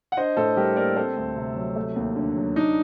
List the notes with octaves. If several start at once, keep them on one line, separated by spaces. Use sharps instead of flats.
F#5
D4 C5 D#5
A2 A4 C5
G3 G4 A#4
A#3 A#4 D5
C4 A4 C5
D2
C3
F#3
A3
D#2
D3
F#3
D4 D#4